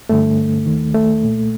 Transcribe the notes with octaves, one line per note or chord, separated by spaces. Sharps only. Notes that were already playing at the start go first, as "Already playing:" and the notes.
G2 D3 A3
D#2 D#3
A3
C2 A#2